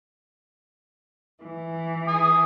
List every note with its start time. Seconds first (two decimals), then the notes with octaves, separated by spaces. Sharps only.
1.43 E3
2.08 G#5 D#6